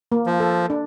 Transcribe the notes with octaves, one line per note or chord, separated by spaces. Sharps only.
A#3
F3
A4
D4